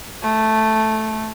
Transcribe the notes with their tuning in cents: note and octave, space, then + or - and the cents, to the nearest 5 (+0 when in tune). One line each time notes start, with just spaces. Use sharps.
A3 -5